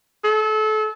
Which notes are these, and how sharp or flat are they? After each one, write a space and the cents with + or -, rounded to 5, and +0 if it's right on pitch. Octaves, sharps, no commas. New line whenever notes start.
A4 -30